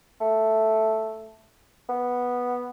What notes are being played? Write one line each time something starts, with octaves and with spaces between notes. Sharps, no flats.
A3
B3